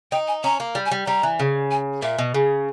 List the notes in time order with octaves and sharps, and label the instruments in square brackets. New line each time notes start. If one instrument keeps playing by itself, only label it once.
[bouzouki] D#4 [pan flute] G5
[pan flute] G#5
[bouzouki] C#4 [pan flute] A#5
[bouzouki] A#3
G3
[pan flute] G#5
[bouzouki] G3
[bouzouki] G3 [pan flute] A#5
[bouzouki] E3
C#3
[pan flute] G#5
[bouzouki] A#2 [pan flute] E5
[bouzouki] B2
C#3